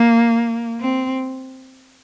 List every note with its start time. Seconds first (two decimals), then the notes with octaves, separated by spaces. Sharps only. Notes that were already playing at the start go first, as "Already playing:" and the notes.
Already playing: A#3
0.80 C4